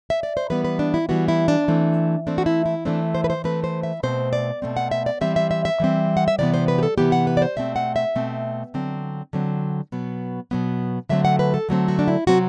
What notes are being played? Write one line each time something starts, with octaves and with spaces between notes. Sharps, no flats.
E5
D5
C5
E3 G3 B3 B4
B4
D4
E4
E3 G3 B3 F#4
E4
D4
E3 A3 C4
E3 A3 C4 D4
F#4
E4
E4
E3 A3 C4 D4
C5
B4
C5
E3 A3 C4 B4
C5
E5
B2 A3 C4 C5
D5
B2 A3 C4
F#5
E5
D5
E3 G3 C4 E5
E5
E5
E5
E3 G3 C4
F#5
E5
C3 E3 B3 D5
C5
B4
G4
A4
C3 E3 B3 G4
F#5
B4
D5
C5
B2 A3 C4 E5
F#5
E5
B2 A3 C4
D3 F#3 C4
D3 F#3 C4
B2 F#3 B3
B2 F#3 B3
D3 F#3 A3 C4 E5
F#5
B4
A4
D3 F#3 A3 C4
F#4
D4
E4
C3 F#3 C4 F#4